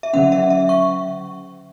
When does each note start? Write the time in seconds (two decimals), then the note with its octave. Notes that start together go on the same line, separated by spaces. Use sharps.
0.03 E5
0.13 D3 F#3 C#4 F#5
0.32 E5
0.50 E5
0.69 C#6